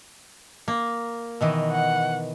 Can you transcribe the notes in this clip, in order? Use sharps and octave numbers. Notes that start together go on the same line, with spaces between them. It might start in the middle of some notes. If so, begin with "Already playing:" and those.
A#3
B2 D#3 E3
F#5